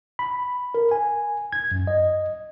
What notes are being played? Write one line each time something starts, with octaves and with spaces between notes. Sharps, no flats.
B5
A#4
G#5
G#6
F#2
D#5